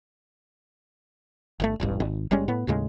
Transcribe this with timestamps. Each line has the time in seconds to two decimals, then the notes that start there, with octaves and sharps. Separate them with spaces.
1.60 G1 C3 A3
1.80 E1 A1 G2
2.00 G#1
2.31 F#1 G3 G#3 C#4
2.48 A2 B3
2.67 D#2 A2 C#3 G#3